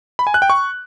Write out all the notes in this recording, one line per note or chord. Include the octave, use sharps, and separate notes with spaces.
B5
G#5
F#6
G5
C#6